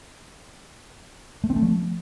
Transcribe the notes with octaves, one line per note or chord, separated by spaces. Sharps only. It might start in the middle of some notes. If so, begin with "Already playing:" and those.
A3
C4
A3
F3